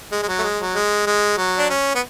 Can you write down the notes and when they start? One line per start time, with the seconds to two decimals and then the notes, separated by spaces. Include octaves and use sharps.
0.11 G#3
0.22 G#3
0.28 F#3
0.39 A3
0.43 G#3
0.59 F#3
0.75 G#3
1.06 G#3
1.37 F#3
1.58 D4
1.69 C#4
1.95 B3